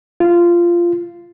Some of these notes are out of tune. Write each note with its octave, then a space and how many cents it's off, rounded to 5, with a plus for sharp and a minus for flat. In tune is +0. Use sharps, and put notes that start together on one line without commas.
F4 -15